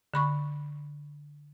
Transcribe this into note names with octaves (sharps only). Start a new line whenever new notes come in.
D3 B5 C#6